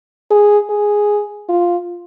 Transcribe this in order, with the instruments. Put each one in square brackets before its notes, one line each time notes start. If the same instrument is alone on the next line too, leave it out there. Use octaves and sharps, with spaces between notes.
[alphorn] G#4
G#4
F4